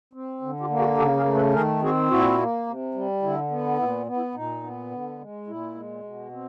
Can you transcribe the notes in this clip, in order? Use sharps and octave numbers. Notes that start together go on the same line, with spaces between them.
C4
D3
F4 G4
A#3
F#4 G#4
C#3 G4 A4
G#4 A#4
A3
A4 B4
D#3 G#4 A#4
C4 F#4 G#4
A#2 E4 F#4
A#3
C3
G3
D3 E4
B3
A#2 E4
B3
E4
A#2 D#4
B3
D3
G#3
A#2 E4
G#3
B2
C4